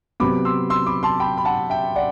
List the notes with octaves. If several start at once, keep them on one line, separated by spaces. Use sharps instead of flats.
C3 F#3 B3 B5 D6
C6 E6
C6 E6
B5 D6
A5 C6
G5 B5
B5
F#5 A5
E5 G5
D5 F#5